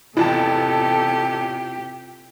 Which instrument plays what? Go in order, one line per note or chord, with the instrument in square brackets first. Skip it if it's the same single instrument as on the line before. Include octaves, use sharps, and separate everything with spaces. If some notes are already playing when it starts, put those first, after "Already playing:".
[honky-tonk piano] A1 E2 A5 [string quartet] C3 G4 [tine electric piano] E4 F4 [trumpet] A4